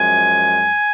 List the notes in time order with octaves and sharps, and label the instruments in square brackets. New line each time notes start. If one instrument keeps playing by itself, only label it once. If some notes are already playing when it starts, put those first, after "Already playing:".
Already playing: [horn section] F#2 F3 G#3 G#5